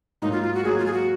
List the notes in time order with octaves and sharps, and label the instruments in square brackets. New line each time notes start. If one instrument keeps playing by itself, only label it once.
[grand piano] G#2 F#3 A#3 [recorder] D#4
[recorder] F4
F4
F#4
[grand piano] G#2 F#3 A#3 [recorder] G#4
[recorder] F4
G#4
F#4